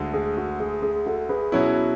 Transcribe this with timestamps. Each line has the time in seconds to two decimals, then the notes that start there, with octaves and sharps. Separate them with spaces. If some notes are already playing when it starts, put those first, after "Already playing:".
Already playing: D2 D3 G#3
0.14 G#4
0.37 F#4
0.60 G#4
0.82 G#4
1.06 F#4 A4
1.29 G#4 B4
1.52 B2 F#3 C#4 E4